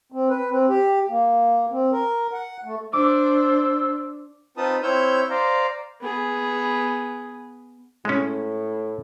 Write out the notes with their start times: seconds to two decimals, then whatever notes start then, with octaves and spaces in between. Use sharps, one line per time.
0.12 C4
0.30 B4
0.50 C4
0.69 G4
1.09 A#3
1.71 C4
1.92 A#4
2.33 F#5
2.64 A3
2.93 D4 C5 D6 E6
4.57 C4 D#4 F4 B4 A5 D#6
4.83 C4 E4 C#5 E6 F6 G6
5.30 C5 D5 F5 A#5
6.01 B3 G#4
8.05 A2 G#3 C#4